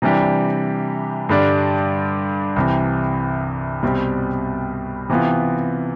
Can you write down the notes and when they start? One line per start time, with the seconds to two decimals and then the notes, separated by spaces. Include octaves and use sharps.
0.02 C3 E3 G3 D4 G4
1.29 G2 D3 G3 D4
2.56 C2 C3 E3
3.83 C2 B2 G3 C4 G4
5.09 C3 E3 B3 F4